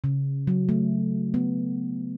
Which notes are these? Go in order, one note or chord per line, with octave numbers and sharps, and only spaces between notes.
C#3
F#3
A3
B3